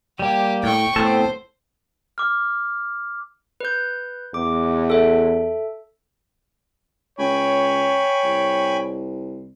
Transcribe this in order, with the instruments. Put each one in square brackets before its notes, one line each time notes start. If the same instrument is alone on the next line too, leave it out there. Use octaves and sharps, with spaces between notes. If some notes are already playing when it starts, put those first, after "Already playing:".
[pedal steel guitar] G3 A#3 [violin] G4
[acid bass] A2 [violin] G5 C#6
[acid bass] A2 [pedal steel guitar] B3 C4 A4 [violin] C5
[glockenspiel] D6 F6
[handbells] B4 G6
[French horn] E2 [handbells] D6
[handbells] A4 E5
[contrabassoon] C#2 [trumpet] C#5 [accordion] G5 G#5 B5
[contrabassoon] C2